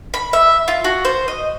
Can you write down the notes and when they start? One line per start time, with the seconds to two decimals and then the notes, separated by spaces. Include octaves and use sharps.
0.14 B5
0.33 E5
0.68 F4
0.84 F#4
1.05 C5
1.28 D#5